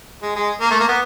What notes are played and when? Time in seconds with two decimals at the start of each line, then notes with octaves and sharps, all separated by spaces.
0.22 G#3
0.36 G#3
0.60 A#3
0.70 A3
0.80 A#3
0.89 B3